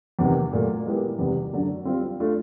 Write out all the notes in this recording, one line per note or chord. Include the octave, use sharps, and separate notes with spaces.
E2 C3 D#3
A#2 F#3 A3
G#3 B3 E4 G4 A#4
E2 C3 D#3 G3
F#2 D3 F#3
G3 C4 F4
A3 D4 F4